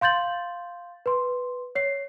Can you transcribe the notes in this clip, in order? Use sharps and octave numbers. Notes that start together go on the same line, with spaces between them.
F5 C6 G6 A6 F#7
B4 C6
C#5 C7